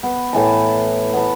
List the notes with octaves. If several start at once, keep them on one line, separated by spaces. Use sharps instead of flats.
B3
A2 E3 A5
B3 A5